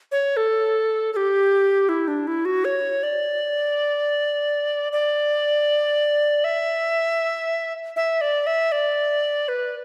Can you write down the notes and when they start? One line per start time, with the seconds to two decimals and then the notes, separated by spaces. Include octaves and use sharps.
0.12 C#5
0.37 A4
1.13 A4
1.16 G4
1.89 E4
2.08 D4
2.27 E4
2.45 F#4
2.65 C#5
3.03 D5
4.93 D5
6.44 E5
7.96 E5
8.21 D5
8.47 E5
8.72 D5
9.48 B4